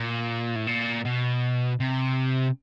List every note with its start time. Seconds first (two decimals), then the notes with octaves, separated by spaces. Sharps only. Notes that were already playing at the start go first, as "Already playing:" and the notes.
Already playing: A#2
0.56 A2
0.67 A#2
1.05 B2
1.80 C3